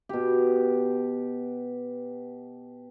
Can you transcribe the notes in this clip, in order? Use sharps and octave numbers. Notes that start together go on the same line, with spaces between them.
B2 G4